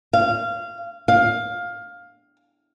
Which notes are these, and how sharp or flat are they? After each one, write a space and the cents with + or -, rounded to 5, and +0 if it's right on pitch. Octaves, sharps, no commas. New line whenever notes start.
F5 -20
F5 +15